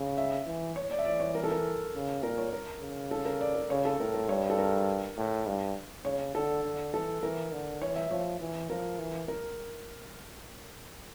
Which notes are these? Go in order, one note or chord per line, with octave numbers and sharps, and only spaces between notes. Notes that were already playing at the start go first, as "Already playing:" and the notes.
Already playing: C#3
E5
E3
C#5
D5
E5
E3 D5
C#5
A#4
A4
A#4
C#3
A#2 A#4
C#5
A#4
C#3
A4
A#4
D5
A#4
C#3 C#5
A4
A2 A#4
A#4
G2 C#5
A4
A#4
A2
G2
C#3 C#5
D3 A4
D3
E3 A4
E3 A#4
D3
E3 C#5
E5
F3 C#5
E3
F3 A#4
E3
A#4